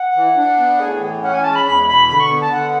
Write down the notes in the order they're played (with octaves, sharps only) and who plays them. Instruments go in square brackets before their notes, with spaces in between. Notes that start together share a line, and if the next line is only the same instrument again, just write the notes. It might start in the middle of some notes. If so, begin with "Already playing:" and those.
Already playing: [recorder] F#5
[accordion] E3
D4
B3
[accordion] A2 [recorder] G#4
[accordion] E3
[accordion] C#4 [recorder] F#5
[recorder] G#5
[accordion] G#3 [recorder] A5
[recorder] B5
[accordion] E2 [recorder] B5
[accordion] B2 [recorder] B5
[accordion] D3 [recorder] B5
[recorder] C#6
[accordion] B3
[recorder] A5
[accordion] D3 [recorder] F#5